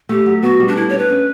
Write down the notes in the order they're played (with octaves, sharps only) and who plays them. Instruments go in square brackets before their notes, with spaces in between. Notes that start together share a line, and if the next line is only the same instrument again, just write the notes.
[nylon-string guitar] A3 [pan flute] G4
[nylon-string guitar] F#3
[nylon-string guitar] B3 [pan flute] F#4
[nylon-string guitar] G3
[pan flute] D4
[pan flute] E4 [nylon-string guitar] A4
[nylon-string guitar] D4 [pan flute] C#5
[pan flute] B4
[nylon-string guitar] C#4